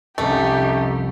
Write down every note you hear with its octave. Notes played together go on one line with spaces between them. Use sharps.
C2 F2 A3 C#4 D#4 G4